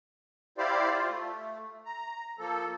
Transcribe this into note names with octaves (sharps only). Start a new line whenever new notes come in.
E4 G4 C5 D5 F5
F4
A3
A#5
F3 A#3 A4